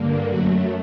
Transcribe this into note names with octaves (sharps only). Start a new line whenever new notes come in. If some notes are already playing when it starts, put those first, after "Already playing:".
Already playing: G2 D3 A#3
F#2 F#3 A3 F#4